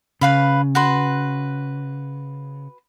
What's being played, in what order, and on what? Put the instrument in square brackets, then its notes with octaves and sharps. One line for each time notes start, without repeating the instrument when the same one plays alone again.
[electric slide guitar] C#3 [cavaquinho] B4 F5 B5
[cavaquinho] F#4 B4 C6